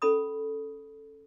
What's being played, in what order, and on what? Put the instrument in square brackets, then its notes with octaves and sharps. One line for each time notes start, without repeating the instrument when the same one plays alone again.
[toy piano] C#4 A4 B5 D#6